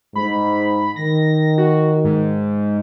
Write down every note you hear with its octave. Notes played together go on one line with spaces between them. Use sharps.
G#2 B5
D#3 A#6
F#4
G#2